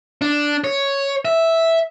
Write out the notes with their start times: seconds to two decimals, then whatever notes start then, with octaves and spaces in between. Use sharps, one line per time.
0.22 D4
0.64 C#5
1.25 E5